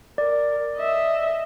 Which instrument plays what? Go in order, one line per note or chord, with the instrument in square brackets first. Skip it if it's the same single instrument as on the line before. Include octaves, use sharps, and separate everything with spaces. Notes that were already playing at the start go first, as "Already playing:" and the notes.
[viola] A#4 [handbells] D5
[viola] D#5 E5